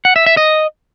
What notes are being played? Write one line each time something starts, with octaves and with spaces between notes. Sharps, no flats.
F#5
E5
E5
D#5